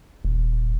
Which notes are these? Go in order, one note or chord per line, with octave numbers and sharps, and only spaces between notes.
D#1